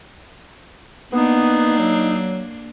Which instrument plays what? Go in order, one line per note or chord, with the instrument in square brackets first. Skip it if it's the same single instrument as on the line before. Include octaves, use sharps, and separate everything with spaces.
[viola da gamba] A#3 D4 [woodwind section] B3 [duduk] D#4
[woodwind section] F#3